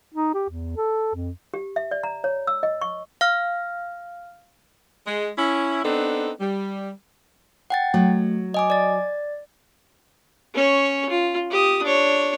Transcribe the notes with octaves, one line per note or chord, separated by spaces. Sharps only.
D#4
G4
E2
A4
F2
G4
E5
D5
A#5
C#5
E6
D#5
C#6
F5 F6
G#3
C#4 E4
B3 C4 D4 D#4 A4
G3
F#5 G5 A6
F#3 A3
D#5 G#5 D6
D5 A6
C#4 C#5
F4
G4 D#6
D4 C#5